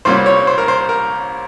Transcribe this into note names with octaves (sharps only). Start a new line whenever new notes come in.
C2 A#2 G3 A#3 C#4 C5
C#5
C5
A#4
C5
A#4